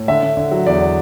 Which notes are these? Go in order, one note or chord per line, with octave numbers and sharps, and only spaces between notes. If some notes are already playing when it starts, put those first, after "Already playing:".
Already playing: A2
D3 E5
D3
D3
F#3
E2 D5